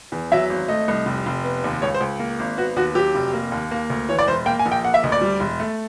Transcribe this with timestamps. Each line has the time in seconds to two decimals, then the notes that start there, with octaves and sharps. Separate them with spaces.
0.12 E2
0.32 F#3 E5
0.50 G#1
0.68 A3 D#5
0.88 C2
1.06 F1
1.26 F1
1.44 B3
1.64 D#2
1.82 C#2 C#5
1.95 C5
2.01 C#2
2.19 A#3
2.39 G#1
2.57 B3 F#4
2.76 D#2 F#4
2.95 F#3 G4
3.15 F1
3.33 A#3
3.52 D#2
3.71 A#3
3.90 D2
4.09 E3 C#5
4.19 D5
4.27 E1 C5
4.46 A#3 G5
4.59 G#5
4.66 A#1
4.72 G5
4.84 A#3 F#5
4.94 E5
5.03 D2 D#5
5.12 D5
5.21 G3
5.40 E1
5.60 A3